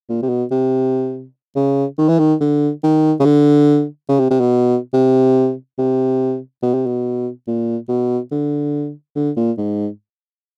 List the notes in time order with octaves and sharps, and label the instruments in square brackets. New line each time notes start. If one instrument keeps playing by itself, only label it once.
[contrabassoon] A#2
C3
B2
C3
C#3
D#3
E3
D#3
D3
D#3
C#3
D3
C#3
C3
C3
B2
C3
C3
B2
C3
B2
A#2
B2
D3
D3
A#2
G#2